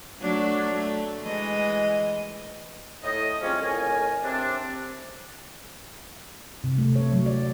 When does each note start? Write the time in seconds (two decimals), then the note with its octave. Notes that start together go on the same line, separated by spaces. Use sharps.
0.19 F#3 A3 D4
0.72 A3
1.22 E3 G#3 D#5
3.04 A2 D#5
3.41 F3 G3 G#3 C4 C#4
3.58 F2 A2 C#3 A#4 G#5
4.24 C3 C4 D4
6.64 C3
6.78 A3
6.96 C#5
7.13 F#3
7.26 D5